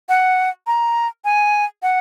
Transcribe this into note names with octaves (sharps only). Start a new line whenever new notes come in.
F#5
A#5
G#5
F#5